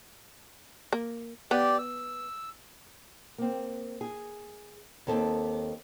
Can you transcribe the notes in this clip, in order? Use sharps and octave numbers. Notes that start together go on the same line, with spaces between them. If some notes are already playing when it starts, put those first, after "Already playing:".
A#3
B3 G4 D5
E6
A#3 C4
G#4
D#2 C4 A4